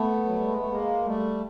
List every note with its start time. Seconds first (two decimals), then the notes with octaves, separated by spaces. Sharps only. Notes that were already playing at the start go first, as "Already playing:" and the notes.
Already playing: A3 B3
0.25 F#3
0.36 G3
0.47 G#3
0.58 A3
0.69 G#3 A#3
1.04 G3 A3